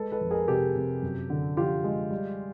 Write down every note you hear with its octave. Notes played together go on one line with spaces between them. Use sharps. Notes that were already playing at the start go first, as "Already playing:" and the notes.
Already playing: G#3 A4 B4
A4 B4
F2
G#4 A#4
C3 G4 A4
C3
F#2
D3
F3 F4 G4
G#3
G3